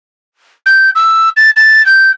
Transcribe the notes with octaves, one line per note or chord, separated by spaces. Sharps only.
G6
E6
A6
A6
G6